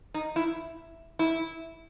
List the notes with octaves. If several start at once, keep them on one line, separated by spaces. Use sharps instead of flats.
D#4
E4
E4